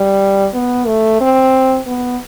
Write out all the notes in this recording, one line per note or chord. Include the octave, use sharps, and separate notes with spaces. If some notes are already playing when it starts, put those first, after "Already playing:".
Already playing: G3
B3
A3
C4
B3